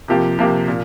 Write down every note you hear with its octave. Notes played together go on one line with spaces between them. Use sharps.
C3 F3 A#3 G4
C3 F3 A#3 G4
A#2